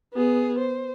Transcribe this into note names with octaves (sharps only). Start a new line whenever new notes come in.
B3 G#4
C5